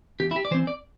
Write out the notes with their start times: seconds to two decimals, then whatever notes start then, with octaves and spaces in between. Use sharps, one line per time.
0.20 E2 G4
0.31 E4
0.36 G4
0.45 D5
0.51 E3 C5
0.54 C4
0.67 D5